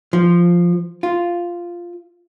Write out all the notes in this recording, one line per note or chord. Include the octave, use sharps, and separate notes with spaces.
F3
F4